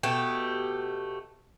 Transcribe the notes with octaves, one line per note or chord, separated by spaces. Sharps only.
B2 A3 G4